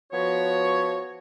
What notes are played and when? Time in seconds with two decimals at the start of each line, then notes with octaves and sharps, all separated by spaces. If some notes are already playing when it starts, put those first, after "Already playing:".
0.12 F3 B3 F#4 C#5